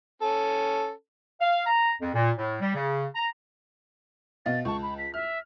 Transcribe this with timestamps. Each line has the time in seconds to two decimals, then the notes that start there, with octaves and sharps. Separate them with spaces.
0.22 C#4 A4
1.41 F5
1.66 A#5
2.01 F2
2.14 A#2
2.37 A2
2.61 G3
2.75 C#3
3.15 A#5
4.46 B2 D#5 F5 A6
4.65 C#2 A5 C#6
4.82 B5
4.98 B6
5.14 E5 F6